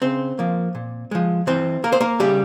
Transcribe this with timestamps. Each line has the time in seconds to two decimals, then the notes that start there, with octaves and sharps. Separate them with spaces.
0.02 C#3 C4 C5
0.39 F3 A#3
0.75 A#2
1.11 F3 G#3
1.47 E3 C4 C5
1.84 A#3 A#4
1.92 C5
2.01 A#3 A#4
2.20 C#3 G3 G4